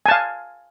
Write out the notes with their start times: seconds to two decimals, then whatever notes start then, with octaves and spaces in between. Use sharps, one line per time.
0.06 G#5
0.08 A5
0.11 F5